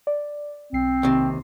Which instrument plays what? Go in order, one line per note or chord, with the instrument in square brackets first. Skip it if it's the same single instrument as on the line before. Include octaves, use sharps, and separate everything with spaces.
[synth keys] D5
[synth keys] B1 C7 [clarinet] C4
[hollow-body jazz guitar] D#2 C3